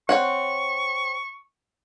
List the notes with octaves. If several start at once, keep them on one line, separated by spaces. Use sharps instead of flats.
C4 C#5 F#5 C#6